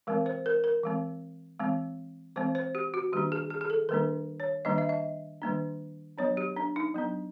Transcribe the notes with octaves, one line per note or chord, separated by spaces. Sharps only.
E3 G#3 C4 A#4
C5
A#4
A#4
E3 G#3 C4
E3 G#3 C4
E3 G#3 C4 C5
C5
G4
F#4
D#3 G3 A#3 D4 G4
G#4
G#4
G#4
A4
D#3 G3 A#3 D4 A#4
C#5
D#3 G3 A#3 D4 D#5
E5
D#5
D#3 G3 A#3 D4
F#3 B3 D4 C#5
G4
D4
D#4
F#3 B3 D4